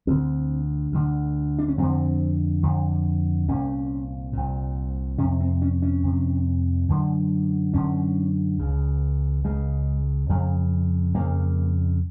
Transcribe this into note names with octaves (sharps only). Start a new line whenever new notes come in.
D2 D3 C4
D2 D3
D4
C#4
F2 D3 C4
F2 D3
C2 A#2 C#4
C2 A#2
F2 C3 C#4
C4
C#4
C#4
F2 C3
F#2 D3
F#2 D3 C#4
C#2 C#3
C#2 C#3 G#3
F2 C#3
F2 C#3 A#3